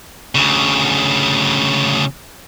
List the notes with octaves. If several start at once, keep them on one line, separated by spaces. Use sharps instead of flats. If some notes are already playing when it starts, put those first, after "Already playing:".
D2 C#3